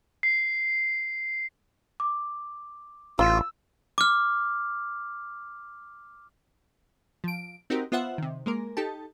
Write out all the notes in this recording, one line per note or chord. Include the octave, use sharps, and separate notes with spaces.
C7
D6
A1 F4 E6
D6 F6
F3 D7
C4 D#4 F#4 G4 A#4
B3 F4 C5 E5 F#5
C3 D#3
G#3 A#3 A#4
D#4 G4 A4 A5